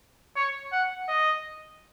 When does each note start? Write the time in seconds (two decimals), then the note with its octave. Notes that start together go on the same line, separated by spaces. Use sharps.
0.36 C#5
0.72 F#5
1.08 D#5